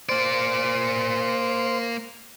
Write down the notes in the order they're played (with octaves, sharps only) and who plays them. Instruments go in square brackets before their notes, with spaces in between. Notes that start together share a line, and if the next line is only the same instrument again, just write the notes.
[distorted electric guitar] A#3 D5 [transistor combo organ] C5